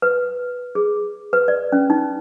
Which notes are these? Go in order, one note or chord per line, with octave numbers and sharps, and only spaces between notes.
B4
G#4
B4
D5
C#4
D#4